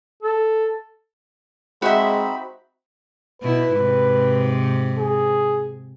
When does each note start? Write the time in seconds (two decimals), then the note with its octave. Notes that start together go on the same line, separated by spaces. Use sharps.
0.23 A4
1.82 G#3 C4 D#4 F#4 E5 B5
3.42 B2 E4 B4
3.75 G#2 C3
4.99 G#4